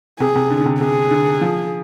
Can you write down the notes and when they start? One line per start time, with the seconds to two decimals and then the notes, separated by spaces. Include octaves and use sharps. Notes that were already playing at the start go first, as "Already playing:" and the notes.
0.20 C3 G#4
0.35 C3
0.50 D3
0.60 D3
0.65 C3
0.81 C3 G#4
1.11 D3
1.41 F3